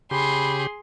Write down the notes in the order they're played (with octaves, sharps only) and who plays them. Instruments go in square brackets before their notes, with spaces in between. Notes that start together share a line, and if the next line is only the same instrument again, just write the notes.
[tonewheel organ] C#3 G4 [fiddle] G#4 C6 [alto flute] B5